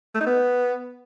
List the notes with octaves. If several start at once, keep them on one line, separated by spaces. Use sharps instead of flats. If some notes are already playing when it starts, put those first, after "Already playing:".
A3
D#4
B3